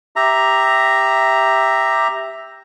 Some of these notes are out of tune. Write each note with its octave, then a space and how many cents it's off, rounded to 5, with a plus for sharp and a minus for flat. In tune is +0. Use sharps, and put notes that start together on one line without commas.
G4 +0 E5 +0 A#5 +0